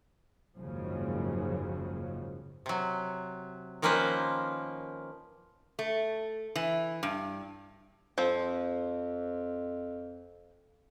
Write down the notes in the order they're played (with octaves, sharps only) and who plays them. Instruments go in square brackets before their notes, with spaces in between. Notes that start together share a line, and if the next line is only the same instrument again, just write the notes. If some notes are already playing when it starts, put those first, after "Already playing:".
[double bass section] F#1 D#2 G#2 C#3 F3 F#3
[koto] C3 F#3
D#3 F3 A#3 C#4 B4 C5
[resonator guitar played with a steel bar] A3
E3
G2
[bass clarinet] F2 [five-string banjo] F3 C4